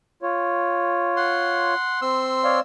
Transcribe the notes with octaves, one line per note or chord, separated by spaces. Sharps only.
F4 C#5
F#5 C6
C4 C6 E6
C#5 D5 F5